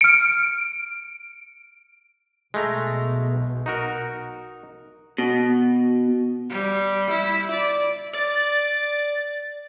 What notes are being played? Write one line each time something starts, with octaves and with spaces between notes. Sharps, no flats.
F6 C#7 D7
B1 B2 G#3 A3 A#5
D#4 F#4 A#4
B2
G3
E4
D5
D5 A6